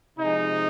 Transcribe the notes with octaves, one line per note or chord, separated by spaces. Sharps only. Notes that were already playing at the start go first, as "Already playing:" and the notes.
C3 F3 G#3 D#4